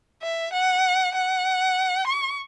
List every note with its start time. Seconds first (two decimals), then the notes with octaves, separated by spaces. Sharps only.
0.22 E5
0.53 F#5
1.15 F#5
2.07 C#6